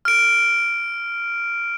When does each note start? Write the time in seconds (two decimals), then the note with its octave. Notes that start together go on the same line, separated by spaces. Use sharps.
0.05 F6 D7